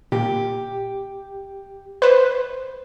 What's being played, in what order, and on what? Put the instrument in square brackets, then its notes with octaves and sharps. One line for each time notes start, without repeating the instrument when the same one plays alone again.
[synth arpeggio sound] A#2 [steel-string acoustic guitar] G4
[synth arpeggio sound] B4 C5